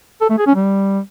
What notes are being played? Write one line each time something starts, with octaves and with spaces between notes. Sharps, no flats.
A4
A3
G#4
C#4
G3